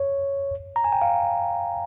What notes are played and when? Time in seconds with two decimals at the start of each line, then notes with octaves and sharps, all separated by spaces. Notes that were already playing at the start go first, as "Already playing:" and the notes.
Already playing: C#5
0.76 A#5
0.84 G#5
0.92 G5
1.02 F5